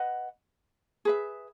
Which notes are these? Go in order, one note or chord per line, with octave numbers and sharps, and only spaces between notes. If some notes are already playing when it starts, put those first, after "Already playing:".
Already playing: B4 D#5 F#5
G#4 B4 E5